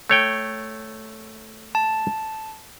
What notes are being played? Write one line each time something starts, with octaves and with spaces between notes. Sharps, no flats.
A3 C#5 G5
A5